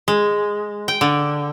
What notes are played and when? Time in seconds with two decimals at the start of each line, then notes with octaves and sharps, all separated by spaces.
0.08 G#3
0.88 G5
1.01 D3